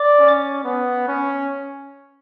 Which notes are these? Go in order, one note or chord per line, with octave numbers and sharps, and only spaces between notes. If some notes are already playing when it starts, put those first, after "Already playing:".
Already playing: D5 D6
C#4
B3
C#4